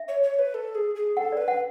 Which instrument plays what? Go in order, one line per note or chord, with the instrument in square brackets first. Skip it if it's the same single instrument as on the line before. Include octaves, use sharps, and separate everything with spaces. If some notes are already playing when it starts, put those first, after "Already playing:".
Already playing: [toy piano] E5
[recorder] C#5
C#5
B4
A4
G#4
G#4
[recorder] A4 [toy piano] F#5
[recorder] B4 [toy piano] D5
[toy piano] F#5